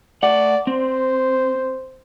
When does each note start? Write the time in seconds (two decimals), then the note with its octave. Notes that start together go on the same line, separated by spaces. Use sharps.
0.23 A3 D5 F#5
0.67 C4 C5